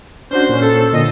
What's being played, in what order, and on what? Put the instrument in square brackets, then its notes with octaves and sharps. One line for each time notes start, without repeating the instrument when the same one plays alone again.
[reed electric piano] C#4 D4 F#4 [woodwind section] C5
[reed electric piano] A#2 C#4
[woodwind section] A4
[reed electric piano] A#2 D3 [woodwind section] D#5